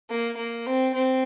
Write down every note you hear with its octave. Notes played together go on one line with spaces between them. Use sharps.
A#3
A#3
C4
C4